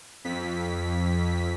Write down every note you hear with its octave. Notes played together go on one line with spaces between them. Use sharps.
F2 B6